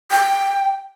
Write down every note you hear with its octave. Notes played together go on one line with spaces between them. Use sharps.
G5